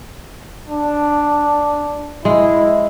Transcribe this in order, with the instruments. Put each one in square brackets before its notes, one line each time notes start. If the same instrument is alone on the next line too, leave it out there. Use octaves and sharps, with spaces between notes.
[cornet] D4
[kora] G#3 [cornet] E4